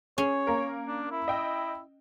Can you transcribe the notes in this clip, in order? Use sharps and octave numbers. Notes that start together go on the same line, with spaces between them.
C#4 G#4 C#5
A#3 A#4
D4
E4
D#5 G5 E6